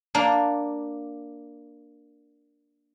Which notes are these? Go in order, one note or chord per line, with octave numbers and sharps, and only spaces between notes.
A#3 D4